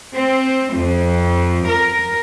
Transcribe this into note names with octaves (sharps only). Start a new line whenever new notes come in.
C4
F2
A#4